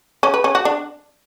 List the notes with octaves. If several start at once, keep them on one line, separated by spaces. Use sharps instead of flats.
C#4
B4
C#4
F#4
D4